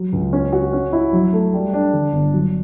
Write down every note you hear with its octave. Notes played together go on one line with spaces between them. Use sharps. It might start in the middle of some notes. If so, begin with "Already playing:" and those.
Already playing: F#3
C#2
C#4
F#4
C#4
E4
F#3
A3
G3
D4
D3
G1
F#3